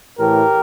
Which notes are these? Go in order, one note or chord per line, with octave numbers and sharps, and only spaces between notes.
A2 E3 G4 A#4